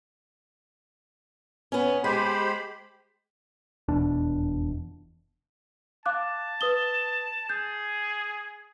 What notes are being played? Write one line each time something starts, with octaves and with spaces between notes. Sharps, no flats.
B3 C#4
G#3 G4 C5 B5
F1 E2 B2 D4
F5 A5 D6 F#6
B4 D#6 G7
G#4 G6